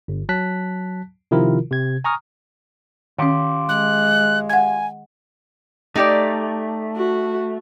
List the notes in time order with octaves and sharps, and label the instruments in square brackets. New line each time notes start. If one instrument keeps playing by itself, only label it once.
[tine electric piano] G1
F#3 A5 F#6 B6
C3 D#3 F3 E4 F4 A#4
C3 G#6
G#5 A#5 C#6 D#6 F6
[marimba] D#3 C#4 [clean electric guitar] F4 G4
[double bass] G#3 [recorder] F#6
[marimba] F#5 G#6 [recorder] G#5
[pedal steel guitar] A3 [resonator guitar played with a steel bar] D#4 G4 D5
[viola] F#4